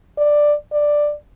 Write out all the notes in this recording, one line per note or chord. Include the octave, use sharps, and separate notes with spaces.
D5
D5